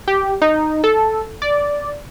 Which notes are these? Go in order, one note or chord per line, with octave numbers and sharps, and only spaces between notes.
G4
D#4
A4
D5